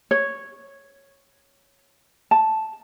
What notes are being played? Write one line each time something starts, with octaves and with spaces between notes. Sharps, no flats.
C#5
A5